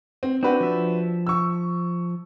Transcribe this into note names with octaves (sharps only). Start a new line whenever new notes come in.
C4
C4 D4 F#4 B4
F3 E5
C#6 E6